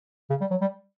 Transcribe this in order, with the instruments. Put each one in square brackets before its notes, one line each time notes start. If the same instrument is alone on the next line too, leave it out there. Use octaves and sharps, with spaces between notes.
[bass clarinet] C#3
G3
F#3
G3